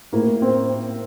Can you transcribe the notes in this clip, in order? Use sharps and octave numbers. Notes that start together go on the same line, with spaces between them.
A2 A#3
C4